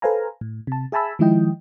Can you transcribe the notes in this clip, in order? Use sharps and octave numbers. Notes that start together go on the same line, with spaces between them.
A4 B4 C5 F5 G#5 A#5
A2
C3 A5
G#4 E5 G#5 A5 B5 E6
D#3 F3 G#3 E4 D#5 G5